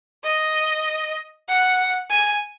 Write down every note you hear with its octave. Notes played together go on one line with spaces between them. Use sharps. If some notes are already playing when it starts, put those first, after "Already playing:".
D#5
F#5
G#5